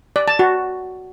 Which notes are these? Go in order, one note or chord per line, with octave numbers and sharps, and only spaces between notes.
D5
A5
F#4